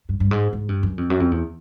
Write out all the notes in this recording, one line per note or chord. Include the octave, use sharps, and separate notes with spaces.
G2
G2
G#2
G#2
G2
F#2
F2
F#2
F2
E2